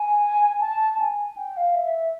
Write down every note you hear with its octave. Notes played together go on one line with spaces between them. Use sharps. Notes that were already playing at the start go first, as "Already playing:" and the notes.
Already playing: G#5
A5
G#5
G5
F5
E5